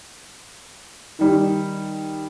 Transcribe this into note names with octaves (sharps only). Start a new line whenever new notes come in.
D#3 G3